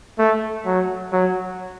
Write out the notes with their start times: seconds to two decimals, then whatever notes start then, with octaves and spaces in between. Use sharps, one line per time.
0.19 A3
0.66 F#3
1.12 F#3